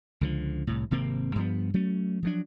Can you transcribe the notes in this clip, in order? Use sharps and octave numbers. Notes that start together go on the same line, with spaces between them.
C#2 D3 F3
C2 A2
G#1 C3 A#3 C4
G2 F3 B3
F#3 A3 C#4
F3 F#3 D4